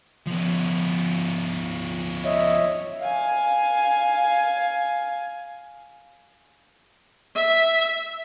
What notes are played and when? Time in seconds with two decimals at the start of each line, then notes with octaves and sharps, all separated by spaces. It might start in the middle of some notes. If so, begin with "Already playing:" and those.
0.27 F3 B3
2.25 C#5 D#5 E5
3.01 F5 G#5
7.35 E5